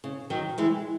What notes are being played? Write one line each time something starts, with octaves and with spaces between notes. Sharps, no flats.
C#3
D#3 F#3
E3 G#3